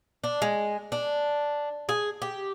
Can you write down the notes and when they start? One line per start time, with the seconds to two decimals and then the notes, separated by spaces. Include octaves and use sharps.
0.24 D4
0.42 G#3
0.92 D4
1.89 G#4
2.22 G4